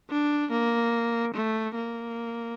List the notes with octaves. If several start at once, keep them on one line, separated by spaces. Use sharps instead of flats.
D4
A#3
A3
A#3